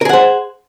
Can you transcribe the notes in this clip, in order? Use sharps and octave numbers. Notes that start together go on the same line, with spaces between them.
G#4 A#4 C5 F#5